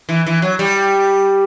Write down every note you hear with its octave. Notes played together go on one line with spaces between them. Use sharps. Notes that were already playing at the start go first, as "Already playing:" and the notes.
E3
E3
F#3
G3